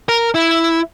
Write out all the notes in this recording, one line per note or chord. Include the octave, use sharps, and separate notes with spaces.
A#4
E4